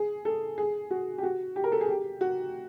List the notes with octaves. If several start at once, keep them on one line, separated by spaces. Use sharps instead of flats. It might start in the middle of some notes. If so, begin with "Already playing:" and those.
Already playing: G#4
A4
G#4
F#4
G4
F#4
G4
A#4
A4
G#4
G4
F#4